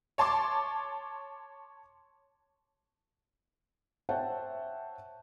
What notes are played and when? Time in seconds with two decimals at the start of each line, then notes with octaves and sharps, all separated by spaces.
0.18 C#5 A5 C6 D6
4.09 C5 C#5 E5 F#5 G5 A5